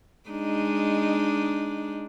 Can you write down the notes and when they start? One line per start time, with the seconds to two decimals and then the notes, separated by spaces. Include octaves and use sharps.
0.29 G#3 D4 D#4